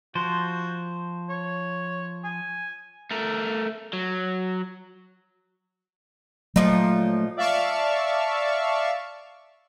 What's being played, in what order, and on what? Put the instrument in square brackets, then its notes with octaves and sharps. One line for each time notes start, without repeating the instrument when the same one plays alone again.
[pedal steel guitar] F3 C5 [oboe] F#4
[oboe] C#5
G#5
[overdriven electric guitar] A3 A#4
F#3
[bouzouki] A#2 F3 D#4 [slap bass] F#3 A3
[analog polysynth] D5 E5 F5 A5 C#6